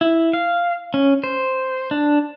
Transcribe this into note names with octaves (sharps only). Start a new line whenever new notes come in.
E4
F5
C#4
C5
D4